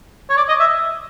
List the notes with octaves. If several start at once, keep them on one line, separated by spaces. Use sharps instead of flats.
C#5
D5
D#5
E5